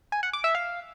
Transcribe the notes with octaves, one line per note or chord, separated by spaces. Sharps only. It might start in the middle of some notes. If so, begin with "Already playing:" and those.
G#5
F#5
D6
E5
F5